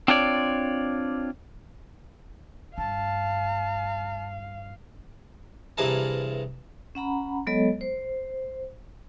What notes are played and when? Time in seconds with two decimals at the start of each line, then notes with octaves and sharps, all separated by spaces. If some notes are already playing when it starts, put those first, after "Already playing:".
0.08 C4 D4 F4 C#5 D5
2.78 G2 F5 A5
5.77 G2 C3 E3 G#4 A#4 A5
6.95 C#4 F#5 A#5 B5
7.47 F#3 G#3 B3 A4 C#5 D#5
7.81 C5